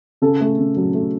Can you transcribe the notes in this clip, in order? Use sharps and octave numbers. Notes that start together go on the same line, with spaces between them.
C#3 A4
A3
C#3
F#3
A3